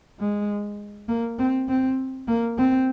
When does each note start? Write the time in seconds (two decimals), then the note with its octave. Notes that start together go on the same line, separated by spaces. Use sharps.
0.19 G#3
1.08 A#3
1.39 C4
1.69 C4
2.28 A#3
2.58 C4